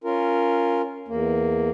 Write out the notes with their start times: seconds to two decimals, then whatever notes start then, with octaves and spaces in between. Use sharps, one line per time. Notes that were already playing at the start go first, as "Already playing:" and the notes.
0.04 C#4 F4 A#4
1.08 E2 A#3